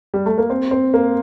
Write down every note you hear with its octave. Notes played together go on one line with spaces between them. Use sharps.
G3
A3
A#3
C4
C4
A#3